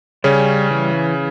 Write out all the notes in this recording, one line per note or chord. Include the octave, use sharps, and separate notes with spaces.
C#3 G3 C#4
E3